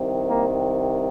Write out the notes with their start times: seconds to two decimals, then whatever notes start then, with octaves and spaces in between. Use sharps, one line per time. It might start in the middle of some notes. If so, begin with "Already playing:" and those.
Already playing: C2 C3 D#3
0.27 A#3